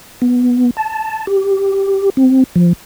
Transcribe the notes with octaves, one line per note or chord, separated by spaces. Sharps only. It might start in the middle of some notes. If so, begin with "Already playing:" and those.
B3
A5
G4
C4
F3